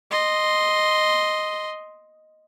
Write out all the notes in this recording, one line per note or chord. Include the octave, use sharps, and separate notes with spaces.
D#5 C6